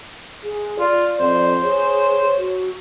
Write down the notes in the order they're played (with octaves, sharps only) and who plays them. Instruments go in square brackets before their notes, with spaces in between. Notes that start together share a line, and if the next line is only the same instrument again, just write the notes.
[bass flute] G#4
[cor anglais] F4 [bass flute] D5
[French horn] F2 [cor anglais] C5
[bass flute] G#4 [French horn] C#5
[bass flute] F#4